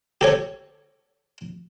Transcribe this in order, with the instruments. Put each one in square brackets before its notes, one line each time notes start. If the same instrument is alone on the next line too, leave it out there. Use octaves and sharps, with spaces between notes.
[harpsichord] G4 A4 C#5